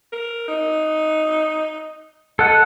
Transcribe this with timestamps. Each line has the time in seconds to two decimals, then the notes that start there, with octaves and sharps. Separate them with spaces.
0.12 A#4
0.48 D#4
2.39 A4 D#5 F#5